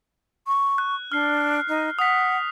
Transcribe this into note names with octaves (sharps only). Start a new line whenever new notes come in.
C#6
F#6
D4 F6 C7
D#4
F#5 D#6 B6